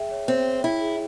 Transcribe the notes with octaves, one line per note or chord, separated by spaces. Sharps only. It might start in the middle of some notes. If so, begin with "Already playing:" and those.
Already playing: G#4 E5 G5
C#5
C4 C#5
C#5
E4 G5
G#4